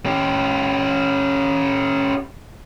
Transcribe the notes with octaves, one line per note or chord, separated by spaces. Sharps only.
C#4 G4